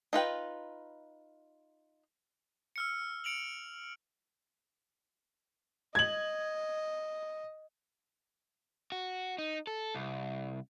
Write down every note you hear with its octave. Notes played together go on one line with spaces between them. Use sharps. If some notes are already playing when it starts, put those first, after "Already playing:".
D#4 F4 B4 G5
E6 F6 C#7
C#7 D7 F7 F#7
D#5 G#6 F#7
F#4
D#4
A4
C2